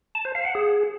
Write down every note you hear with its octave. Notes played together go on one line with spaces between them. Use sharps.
A5
C5
F5
F#5
G#4